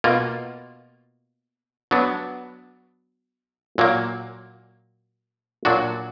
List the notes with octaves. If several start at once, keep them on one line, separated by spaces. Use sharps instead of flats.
B2 A#3 F4
F#3 B3 D4
A#2 F#3 A#3
A#2 F#3 D4 F#4